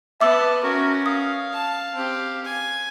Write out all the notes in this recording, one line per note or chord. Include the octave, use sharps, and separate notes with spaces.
B3 E5 A5 D6 E6
C#4 F#4 A#4
F5 D#6
A5
C4 G4
G#5